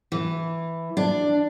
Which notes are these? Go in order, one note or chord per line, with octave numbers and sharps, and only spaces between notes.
E3
D4